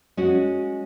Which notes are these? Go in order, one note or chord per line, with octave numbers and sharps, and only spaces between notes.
G#3 C#4 F#4